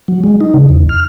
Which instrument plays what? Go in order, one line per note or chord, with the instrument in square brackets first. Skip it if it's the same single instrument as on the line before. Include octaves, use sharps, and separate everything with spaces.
[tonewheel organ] F#3
G#3
D#4
C#3
E2
F6